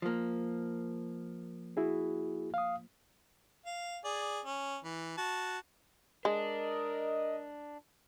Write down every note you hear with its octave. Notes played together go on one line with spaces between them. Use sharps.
F3 A#3
E4 F#4 G#4
F5 D#6
F5
G#4 D5
C#4
E3
F#4 A5
G#3 D4 A#4 D#5